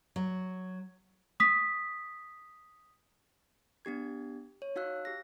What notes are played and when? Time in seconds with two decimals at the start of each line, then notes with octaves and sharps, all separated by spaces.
0.16 F#3
1.40 D#6 B6
3.85 B3 D4 G4 G#6
4.62 C#5
4.76 D#4 F#4 F5 E6 F#6
5.05 G4 A#6